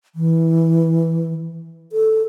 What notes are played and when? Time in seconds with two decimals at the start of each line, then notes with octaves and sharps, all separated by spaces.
0.15 E3
1.92 A4